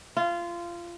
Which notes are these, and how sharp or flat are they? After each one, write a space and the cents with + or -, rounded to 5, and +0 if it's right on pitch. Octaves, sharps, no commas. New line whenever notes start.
F4 -20